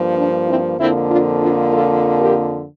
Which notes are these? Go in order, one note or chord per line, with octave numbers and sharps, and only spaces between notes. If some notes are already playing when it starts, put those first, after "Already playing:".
Already playing: G2 F3 A#3
D4
C4 E4
F2 D3 F3 A#3 C4 E4
D4 F4
D4 F4
F4 A4
G4 A#4